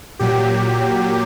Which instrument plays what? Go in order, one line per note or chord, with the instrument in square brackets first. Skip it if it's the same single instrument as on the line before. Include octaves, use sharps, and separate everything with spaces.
[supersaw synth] A#2 F#3 G4